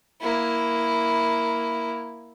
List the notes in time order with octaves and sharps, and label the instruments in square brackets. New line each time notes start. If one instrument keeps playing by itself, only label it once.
[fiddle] A#3 E4